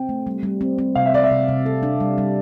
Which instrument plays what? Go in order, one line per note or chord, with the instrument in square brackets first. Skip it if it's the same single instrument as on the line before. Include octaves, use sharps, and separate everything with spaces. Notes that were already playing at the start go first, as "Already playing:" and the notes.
Already playing: [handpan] C4 [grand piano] G5
[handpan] A3
G3
G3
C4
C4
[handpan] C3 [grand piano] F5
[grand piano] E5
[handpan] C3 [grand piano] D5
[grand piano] E5
[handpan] C3
C3
A4
D4
G3
G3